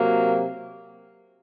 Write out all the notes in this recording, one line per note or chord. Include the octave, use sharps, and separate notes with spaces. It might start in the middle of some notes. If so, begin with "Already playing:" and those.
Already playing: C3 F#3 A#3